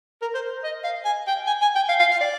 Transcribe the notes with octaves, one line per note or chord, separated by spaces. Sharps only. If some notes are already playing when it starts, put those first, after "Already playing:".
A#4
C5
D#5
F5
G#5
G5
G#5
G#5
G5
F5
F5
F5
D5